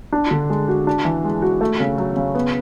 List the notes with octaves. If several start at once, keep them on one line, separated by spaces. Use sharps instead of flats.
D4
D3
G#3
F#4
D4
E3
G#3
F#4
A3
C#3
F#3
C#3
B3